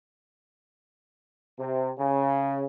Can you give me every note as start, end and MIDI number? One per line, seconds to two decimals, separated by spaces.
1.59 1.92 48
1.99 2.64 49